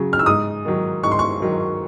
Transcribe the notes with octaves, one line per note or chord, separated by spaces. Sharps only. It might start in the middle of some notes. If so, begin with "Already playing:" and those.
Already playing: C#3 F#3
F6
E6
G#2 D#6
D#3 F#3
G#2 C#6
C6
C#6
D#3 F#3